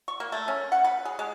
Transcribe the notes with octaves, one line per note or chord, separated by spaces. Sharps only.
C#6
A#3
A3
C#4
F#5
B4
G#4
G#3